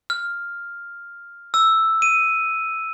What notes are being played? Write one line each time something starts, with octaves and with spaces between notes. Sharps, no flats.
F6
E6
D#7